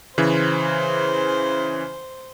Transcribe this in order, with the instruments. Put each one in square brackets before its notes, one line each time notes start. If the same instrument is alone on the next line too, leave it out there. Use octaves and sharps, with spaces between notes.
[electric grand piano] C#3 E3 [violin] C5